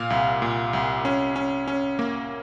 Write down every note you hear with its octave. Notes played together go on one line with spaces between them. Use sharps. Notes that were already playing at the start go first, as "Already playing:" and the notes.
Already playing: A#2 F5
C2
A#2
C2
C#4
C#4
C#4
A#3